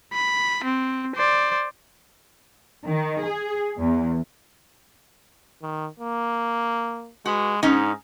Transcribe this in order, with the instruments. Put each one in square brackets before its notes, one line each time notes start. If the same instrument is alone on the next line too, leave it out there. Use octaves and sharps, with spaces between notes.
[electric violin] B5
C4
C5 D5
[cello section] D#3
G#4
E2
[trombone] D#3
A#3
[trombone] G#3 [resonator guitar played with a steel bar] F#4 B4
[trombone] G#2 [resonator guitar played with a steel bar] C#4 D#4